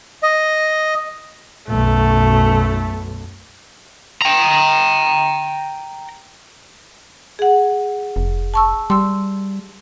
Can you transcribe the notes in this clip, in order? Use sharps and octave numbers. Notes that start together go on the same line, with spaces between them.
D#5
B1 F#2 A3
G5 A#5
G#4 F#5
F1
A5 C#6 E6
G3 C6 E6